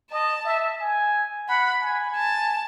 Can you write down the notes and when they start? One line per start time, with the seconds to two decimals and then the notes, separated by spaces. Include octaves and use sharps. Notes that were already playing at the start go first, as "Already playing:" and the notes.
0.11 D#5 A5
0.45 E5
0.80 G#5
1.48 F#5 B5
1.82 G#5
2.17 A5